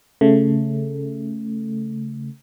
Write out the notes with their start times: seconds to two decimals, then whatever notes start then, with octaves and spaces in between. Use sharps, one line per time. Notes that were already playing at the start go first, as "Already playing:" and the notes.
0.21 C#3 A3